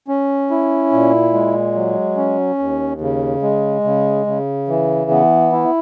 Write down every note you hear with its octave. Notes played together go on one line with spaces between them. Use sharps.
C#4
E4
A#2
G#3
F#3
C#4
D#2
C#3
G#3
C#3
C#3
E3
B3
E4